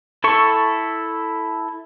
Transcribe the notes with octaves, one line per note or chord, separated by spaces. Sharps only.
E4 A4 C#6